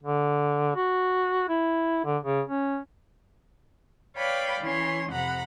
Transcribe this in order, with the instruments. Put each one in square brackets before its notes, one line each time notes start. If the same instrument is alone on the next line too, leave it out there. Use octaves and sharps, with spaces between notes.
[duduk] D3
F#4
E4
D3
C#3
C#4
[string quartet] B4 C#5 D5 F5 G5 B5
E3 C#4 C#5 C6
F2 C3 F#5 A#5 B5